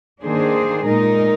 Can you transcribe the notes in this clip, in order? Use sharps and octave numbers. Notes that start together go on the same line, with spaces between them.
D#3 A#3 D4 G#4 C5
A#2 G#3 D#4 A#4